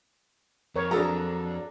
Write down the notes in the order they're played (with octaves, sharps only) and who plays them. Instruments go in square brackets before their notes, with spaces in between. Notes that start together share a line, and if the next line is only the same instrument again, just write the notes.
[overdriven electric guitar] F2 [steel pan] A#4 C#5
[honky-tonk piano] F#3 D4 [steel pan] G#4 [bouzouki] A4 A#5